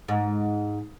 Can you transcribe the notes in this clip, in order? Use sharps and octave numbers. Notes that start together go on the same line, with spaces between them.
G#2